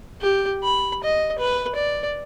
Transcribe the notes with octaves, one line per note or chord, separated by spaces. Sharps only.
G4
B5
D#5
B4
D5